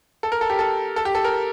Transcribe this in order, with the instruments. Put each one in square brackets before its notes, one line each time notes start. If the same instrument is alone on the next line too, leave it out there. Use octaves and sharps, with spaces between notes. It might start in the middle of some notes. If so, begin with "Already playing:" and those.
[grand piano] A4
A#4
A4
G4
A4
A4
G4
A4
A#4